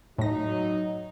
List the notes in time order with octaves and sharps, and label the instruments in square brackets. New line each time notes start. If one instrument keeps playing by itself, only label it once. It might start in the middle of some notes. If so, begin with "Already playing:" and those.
[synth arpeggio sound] A2 A#6 [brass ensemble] F#3 D#4